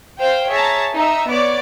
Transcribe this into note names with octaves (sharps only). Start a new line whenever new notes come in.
C5 F5 G5
G#4 C#5 E5 A5 A#5
D#4 E5
B3 C#5 D5 D6